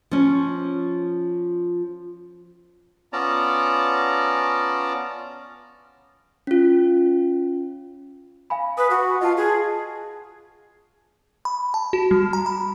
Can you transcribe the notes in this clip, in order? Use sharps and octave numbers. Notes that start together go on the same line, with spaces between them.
F3 C#4
B3 C#4 F4 D5 A5 A#5
C#4 F4
F5 G#5 B5
B4 D#6
F#4
F4 D#5 A5
G#4
B5
A5
F#4
G3
A#5
B5